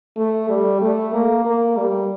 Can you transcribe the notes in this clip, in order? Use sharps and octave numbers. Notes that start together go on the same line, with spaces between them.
A3
G3
A3
A#3
A#3
G3